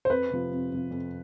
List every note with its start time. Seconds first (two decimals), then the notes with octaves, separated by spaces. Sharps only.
0.05 C5
0.10 F2 B4
0.30 C3 F3
0.51 F2
0.71 C3 F3
0.91 F2